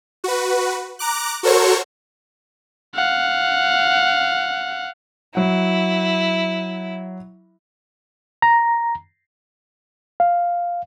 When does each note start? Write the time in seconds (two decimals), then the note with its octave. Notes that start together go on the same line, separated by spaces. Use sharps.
0.24 F#4 B4
0.99 A#5 D6 F#6
1.43 F#4 A4 A#4 C5 C#5 C#6
2.95 F5 F#5
5.35 F#3 E4 F#5
8.42 A#5
10.20 F5